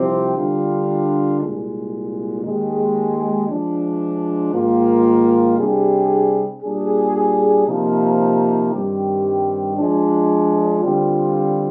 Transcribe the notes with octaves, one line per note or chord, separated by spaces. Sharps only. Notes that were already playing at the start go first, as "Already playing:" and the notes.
Already playing: C2 C3 F3 C4 G4
D3 G3 D4 F4
C2 A#2 G#3
D#2 D#3 G#3
F3 G#3 D4
G#2 D#3 A#3 F4
C3 G3 D4 G#4
A#2 G3 D4 G#4
C3 F3 A#3 D#4
G2 D#3 G3 C4 G4
F3 G#3 D4
D3 G3 C4 F4